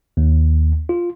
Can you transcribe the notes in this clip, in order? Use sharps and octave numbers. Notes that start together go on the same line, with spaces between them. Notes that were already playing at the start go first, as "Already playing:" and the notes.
D#2
F4